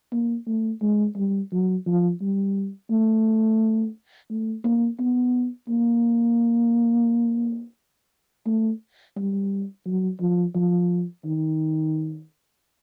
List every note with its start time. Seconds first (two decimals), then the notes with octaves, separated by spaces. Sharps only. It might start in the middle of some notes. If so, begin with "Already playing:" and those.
0.12 A#3
0.47 A3
0.82 G#3
1.16 G3
1.52 F#3
1.86 F3
2.21 G3
2.90 A3
4.30 A3
4.64 A#3
4.99 B3
5.69 A#3
8.46 A3
9.16 G3
9.86 F#3
10.20 F3
10.55 F3
11.25 D#3